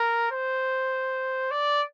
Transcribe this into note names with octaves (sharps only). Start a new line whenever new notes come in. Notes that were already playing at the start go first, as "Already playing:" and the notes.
Already playing: A#4
C5
D5